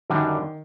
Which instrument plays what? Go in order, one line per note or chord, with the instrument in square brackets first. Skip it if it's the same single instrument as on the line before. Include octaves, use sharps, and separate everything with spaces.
[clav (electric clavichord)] F#2 D3 G3 D4 F#4 [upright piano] D#3